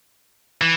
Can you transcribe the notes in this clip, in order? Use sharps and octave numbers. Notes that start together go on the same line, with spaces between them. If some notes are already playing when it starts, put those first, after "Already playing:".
E3